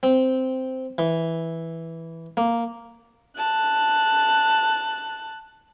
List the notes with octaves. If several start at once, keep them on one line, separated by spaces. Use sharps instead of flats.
C4
E3
A#3
A5 F#6